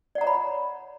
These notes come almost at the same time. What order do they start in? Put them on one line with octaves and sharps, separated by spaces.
D5 F#5 A#5 C#5 B5